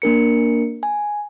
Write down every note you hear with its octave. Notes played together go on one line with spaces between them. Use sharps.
A#3 D4 A#4 C#7
G#5